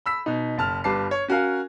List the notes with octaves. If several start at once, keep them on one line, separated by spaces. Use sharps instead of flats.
B5 E6 B6
B2 D#4
F#1 A5 F6
G1 G3 B4 A5 D6 C7
C#5
C#4 F#4 A#4 F5 G#5